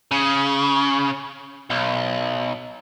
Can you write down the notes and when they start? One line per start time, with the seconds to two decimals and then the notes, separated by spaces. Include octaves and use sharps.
0.11 C#3
1.70 B1